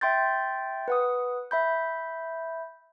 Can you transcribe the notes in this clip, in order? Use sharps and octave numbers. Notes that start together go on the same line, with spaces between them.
E5 G5 C6 G6 A6
B4 F#5 D#6
E5 B5 G6